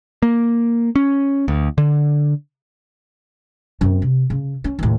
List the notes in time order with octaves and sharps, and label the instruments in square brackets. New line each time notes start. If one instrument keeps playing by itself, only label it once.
[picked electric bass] A#3
C#4
D2
D3
[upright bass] F#2 C4
C3
C#3
C#4
D#2 A2